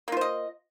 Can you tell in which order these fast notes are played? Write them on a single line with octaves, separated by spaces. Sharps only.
A#3 F4 C5 D#5